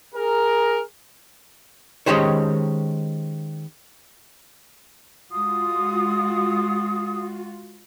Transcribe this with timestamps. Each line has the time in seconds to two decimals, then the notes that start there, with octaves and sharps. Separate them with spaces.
0.15 G#4 A#4
2.06 D#3 G#3 C#4 G4 C5 C#5
5.32 G#3 F4 F#4 D#6